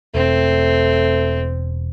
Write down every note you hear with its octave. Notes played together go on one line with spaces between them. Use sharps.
E1 A3 C4